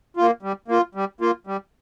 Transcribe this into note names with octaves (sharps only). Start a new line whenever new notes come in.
A#3 F4
G3
A#3 F4
G3
A#3 F4
G3